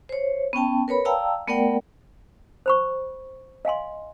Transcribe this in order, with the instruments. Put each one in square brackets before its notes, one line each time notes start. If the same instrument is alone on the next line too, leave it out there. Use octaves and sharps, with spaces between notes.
[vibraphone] C5 C#5
B3 C#4 G5 A5
A#4 B4 C#5 B5
D5 F5 G5 A5 A#5 E6
A3 B3 A#4 D5 F#5 G5
[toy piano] C5 B5 C#6
D#5 F5 G#5 C6